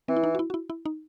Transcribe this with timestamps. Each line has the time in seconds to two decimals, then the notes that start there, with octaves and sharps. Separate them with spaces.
0.08 E3 C4
0.17 E4
0.24 D#4
0.35 F#4
0.39 E4
0.50 F#4
0.54 E4
0.70 E4
0.86 D#4